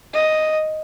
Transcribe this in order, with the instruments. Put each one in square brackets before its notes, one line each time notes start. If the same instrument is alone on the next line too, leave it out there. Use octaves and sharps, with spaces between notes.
[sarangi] D#5